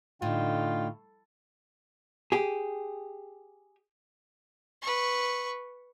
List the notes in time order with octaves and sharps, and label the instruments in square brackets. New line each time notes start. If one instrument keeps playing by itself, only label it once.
[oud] A2 [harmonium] D3 D#4 G5 [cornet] F4
[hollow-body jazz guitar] G4 G#4
[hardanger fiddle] B4 C#6